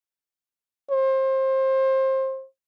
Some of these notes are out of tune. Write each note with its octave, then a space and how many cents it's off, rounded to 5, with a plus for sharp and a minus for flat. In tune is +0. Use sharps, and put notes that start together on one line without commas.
C5 +25